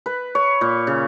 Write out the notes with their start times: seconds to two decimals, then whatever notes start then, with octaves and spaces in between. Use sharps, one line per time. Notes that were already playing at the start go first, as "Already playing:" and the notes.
0.06 B4
0.35 C#5
0.61 A#2
0.87 C#3